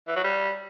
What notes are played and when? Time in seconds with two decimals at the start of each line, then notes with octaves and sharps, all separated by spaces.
0.08 E3
0.16 F#3
0.24 G3